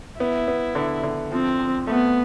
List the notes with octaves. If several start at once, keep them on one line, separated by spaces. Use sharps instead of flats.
B3 E4
B3
D3
D3
F3 C4
F3
A3 B3